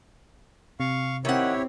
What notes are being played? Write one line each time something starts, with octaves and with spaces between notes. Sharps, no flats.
C3 F5 C#6
D#3 C4 E4 G4 C#5 F#5